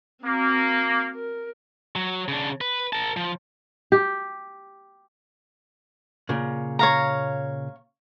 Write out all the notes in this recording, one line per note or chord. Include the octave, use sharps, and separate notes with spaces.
A#3 C4 F#4
A#4
F#3
C#3 D4
B4
A#4 A5
F3
G4
A#2 C#3
C#5 F5 A#5